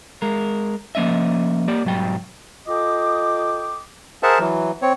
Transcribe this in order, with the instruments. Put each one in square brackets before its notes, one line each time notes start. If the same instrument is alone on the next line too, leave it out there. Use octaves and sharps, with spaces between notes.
[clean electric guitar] G#3 A#4
F3 A#3 C#4 D#5 E5
A#3 G4 D5
B1 G#2 F#3 G3 G5
[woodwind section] F4 A4 D#5 G5 D6 D#6
[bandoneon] G#4 A#4 C5 E5 F#5 A5
E3 F#3
C4 C#5